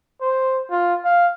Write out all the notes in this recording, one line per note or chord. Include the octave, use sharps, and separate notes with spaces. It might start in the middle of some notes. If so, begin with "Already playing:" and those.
C5
F4
F5